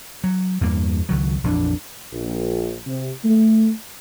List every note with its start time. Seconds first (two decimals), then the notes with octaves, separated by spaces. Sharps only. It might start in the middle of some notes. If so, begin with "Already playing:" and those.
0.24 F#3
0.61 E2 G2 A#3
1.09 C#2 D#3 F#3
1.44 A#1 F2 E3 D4
2.12 A#1
2.87 C3
3.24 A3